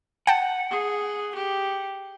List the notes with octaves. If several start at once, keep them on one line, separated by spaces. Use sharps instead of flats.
F#5 G5 A5
G#4
G4